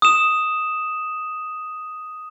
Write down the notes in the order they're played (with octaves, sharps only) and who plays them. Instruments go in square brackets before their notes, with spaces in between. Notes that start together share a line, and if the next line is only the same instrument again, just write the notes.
[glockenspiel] D#6 E7